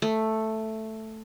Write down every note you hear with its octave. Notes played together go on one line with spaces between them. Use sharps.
A3